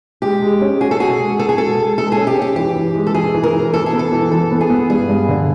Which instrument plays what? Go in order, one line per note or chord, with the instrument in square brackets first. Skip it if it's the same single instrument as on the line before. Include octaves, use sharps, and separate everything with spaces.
[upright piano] G#3 [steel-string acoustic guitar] G4
[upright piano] G#3
C#4
[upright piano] F#4 [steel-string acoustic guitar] G#4
[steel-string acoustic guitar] A4
[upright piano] F#4 [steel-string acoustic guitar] G#4
[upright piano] G#3
[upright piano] F#4 [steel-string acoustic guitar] A4
[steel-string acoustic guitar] G#4
[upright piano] G#3 [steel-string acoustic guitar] A4
[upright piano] G#3
[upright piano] G#3 [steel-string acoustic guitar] A4
[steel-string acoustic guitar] G#4
[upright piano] C#4
[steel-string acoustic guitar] G4
[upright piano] C#4 [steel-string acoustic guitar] G4
[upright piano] E3 [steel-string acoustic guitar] G4
[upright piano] E3
G#3
[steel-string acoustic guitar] A4
[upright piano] E3 [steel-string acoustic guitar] G#4
[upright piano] E3
[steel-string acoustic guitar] A#4
[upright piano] E3
[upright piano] E3 [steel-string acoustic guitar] A4
[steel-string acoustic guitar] G#4
[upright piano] B3
[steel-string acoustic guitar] A4
[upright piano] E3
[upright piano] E3 [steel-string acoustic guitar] A4
[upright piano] B3
[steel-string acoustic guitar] G#4
[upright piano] B3
[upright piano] G2 [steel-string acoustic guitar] G#4
[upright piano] G2
D3